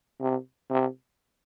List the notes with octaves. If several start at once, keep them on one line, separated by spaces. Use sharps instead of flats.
C3
C3